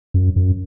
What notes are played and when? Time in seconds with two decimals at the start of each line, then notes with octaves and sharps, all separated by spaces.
0.14 F#2
0.36 F#2